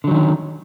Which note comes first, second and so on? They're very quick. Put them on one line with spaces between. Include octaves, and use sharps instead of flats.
D3 F#3 D#3 C#4